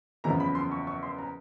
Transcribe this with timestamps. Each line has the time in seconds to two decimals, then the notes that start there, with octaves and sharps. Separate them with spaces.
0.24 F#1 E2 C#3 F3 A#5
0.40 B5
0.55 C6
0.72 C#6
0.87 C#6
1.03 C6
1.18 A#5